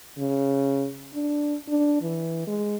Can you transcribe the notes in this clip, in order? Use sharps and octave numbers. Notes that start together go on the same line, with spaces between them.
C#3
D4
D4
E3
G#3